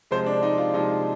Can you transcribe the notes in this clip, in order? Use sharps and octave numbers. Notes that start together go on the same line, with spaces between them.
C3 F3 G#3 C5
D4
D#4
F4
C3 F3 G#3 D#4